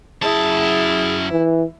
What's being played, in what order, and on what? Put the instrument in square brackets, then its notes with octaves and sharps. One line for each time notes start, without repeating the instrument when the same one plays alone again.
[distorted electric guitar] F#2 A5 [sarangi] E4 [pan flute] G#4
[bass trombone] E3